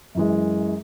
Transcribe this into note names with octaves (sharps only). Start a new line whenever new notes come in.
F#2 E3 G#3